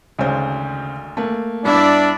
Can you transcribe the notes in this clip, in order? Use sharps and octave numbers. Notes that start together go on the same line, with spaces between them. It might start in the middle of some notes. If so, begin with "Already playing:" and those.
G#1 D2 C#3 C5
A3 A#3
G2 B3 D4 E4 D5 E5